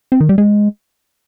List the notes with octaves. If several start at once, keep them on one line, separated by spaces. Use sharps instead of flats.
C4
D#3
G3
G#3